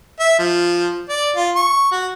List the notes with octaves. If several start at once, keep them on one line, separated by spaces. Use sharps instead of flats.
E5
F3
D5
F4
C#6
F#4